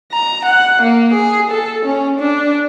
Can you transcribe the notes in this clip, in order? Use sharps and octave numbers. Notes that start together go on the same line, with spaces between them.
A#5
F#5
A#3
G#4
A4
C#4
D4